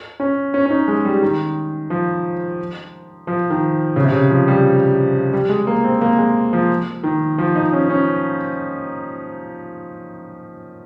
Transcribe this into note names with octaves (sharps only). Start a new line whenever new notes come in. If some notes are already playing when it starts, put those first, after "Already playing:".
C#4
C#4
C#4
D#4
G#3
G3
D#3
F3
F3
D#3
C#3
C3
C#3
F3
G3
G3
G#3
A#3
C4
A#3
G#3
F3
D#3
F3
D#4
C#4
C#4